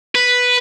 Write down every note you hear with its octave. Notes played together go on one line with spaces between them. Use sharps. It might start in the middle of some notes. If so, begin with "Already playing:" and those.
B4